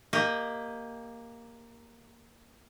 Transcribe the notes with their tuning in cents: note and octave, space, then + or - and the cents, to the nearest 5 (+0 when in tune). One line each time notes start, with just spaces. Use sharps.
A#3 +0 G4 +25 D#5 +0